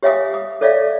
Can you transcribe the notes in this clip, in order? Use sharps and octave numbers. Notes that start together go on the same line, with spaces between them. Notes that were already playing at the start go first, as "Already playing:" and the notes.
G4 C#5 E5 F5 G#5 D#6
D#6
A4 C#5 D5 E5 F5